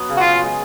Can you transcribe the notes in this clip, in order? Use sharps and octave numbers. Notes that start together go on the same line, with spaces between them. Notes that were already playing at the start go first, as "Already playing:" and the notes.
Already playing: F#3 B3
C#3
F#4
F4
G#3